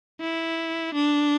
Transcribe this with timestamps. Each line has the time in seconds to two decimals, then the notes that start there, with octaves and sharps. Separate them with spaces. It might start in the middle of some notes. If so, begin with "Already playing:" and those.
0.21 E4
0.94 D4